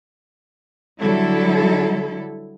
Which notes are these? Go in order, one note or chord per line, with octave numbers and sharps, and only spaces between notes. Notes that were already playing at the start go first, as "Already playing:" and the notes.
D3 F#3 G3 E4 A4